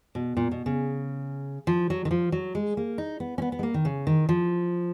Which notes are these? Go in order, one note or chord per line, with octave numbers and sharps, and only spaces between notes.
B2
A#2
B2
C#3
F3
F#3
D#3
F3
F#3
G#3
A#3
D#4
B3
C#4
B3
B3
G#3
A#3
D#3
C#3
D#3
F3